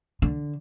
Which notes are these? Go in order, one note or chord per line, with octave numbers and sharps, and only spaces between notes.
D3